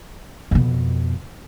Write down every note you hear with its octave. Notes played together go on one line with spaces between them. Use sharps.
F2 B2